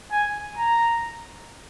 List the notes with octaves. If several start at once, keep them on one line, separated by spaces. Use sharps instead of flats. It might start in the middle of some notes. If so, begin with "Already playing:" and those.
G#5
A#5